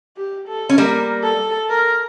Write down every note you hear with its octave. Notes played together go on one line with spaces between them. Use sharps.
G4
A4
C#4
G3 A#3 A#4
A4
A#4